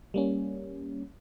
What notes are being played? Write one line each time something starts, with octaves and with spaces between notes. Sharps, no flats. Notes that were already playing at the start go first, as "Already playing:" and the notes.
G3 A#3 C#4